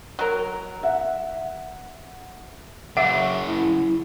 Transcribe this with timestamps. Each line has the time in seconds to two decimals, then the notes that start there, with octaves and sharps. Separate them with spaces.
0.19 F#3 A#4
0.83 E5 F#5
2.97 F#2 C#3 E5 F#5 D6 D7
3.47 E4